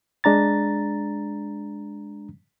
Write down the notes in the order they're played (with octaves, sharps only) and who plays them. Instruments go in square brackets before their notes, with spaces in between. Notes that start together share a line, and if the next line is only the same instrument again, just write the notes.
[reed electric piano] G#3 D4 A#5 A6